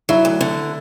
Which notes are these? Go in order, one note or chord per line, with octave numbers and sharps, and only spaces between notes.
F#3 E4
D2
D3